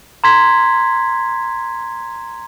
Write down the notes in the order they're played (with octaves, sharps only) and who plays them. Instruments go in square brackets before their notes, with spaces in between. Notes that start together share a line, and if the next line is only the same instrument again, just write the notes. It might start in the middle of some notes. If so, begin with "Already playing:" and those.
[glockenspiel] A#5 C6 G#6 B6